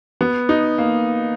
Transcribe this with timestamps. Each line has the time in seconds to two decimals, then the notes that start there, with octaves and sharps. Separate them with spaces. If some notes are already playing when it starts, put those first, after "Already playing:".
0.21 B3
0.49 D#4
0.78 A#3